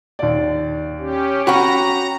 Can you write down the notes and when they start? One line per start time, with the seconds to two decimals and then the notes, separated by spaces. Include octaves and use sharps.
0.19 D#2 D5
0.98 C#4 G4
1.47 C#4 F#4 G5 A#5 B5